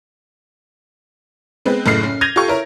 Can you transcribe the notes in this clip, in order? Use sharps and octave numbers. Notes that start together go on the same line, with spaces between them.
G#3 B3 C4 B4
F#1 A2 F6 C7
C#4
G6 G#6 A#6 D#7 F7
F4 G4 A4 F5 C#6
E4 A#4 C#5